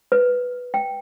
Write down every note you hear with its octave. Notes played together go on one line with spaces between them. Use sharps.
B4
G5